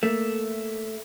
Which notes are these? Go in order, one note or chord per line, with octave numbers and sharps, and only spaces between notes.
A3 A#3